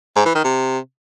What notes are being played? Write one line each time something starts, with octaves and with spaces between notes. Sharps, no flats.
G#2
E3
D#3
C3